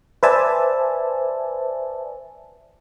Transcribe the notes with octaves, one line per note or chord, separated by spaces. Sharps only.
B4 C5 D5 E5 G#5 A5